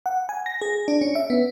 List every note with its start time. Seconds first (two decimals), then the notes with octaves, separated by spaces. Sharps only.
0.06 F#5
0.29 G#5
0.46 A#6
0.61 G#4
0.88 D4
1.01 C#4
1.15 E5
1.30 B3